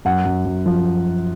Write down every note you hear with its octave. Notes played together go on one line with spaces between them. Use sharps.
F#2 F#5
F#2
F#2
F3